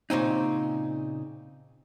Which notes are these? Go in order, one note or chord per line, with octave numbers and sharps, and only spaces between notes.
A#2 C#3 C4 D#4